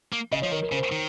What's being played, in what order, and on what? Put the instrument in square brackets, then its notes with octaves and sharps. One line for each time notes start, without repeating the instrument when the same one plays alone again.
[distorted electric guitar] A#3
[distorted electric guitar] C#3 [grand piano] D#5
[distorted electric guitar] F3 [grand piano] C#5
[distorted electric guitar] D#3 [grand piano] A#4
[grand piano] A#4
[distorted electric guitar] C#3 [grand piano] C5
[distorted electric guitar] D#3